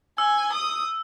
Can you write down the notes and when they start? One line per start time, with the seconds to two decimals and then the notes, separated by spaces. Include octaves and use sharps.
0.18 G#5 E6
0.53 D#6